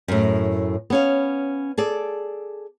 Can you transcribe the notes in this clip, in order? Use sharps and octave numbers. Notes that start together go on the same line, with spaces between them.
F#2 A2
B3 C#4 F5
G#4 A4 D5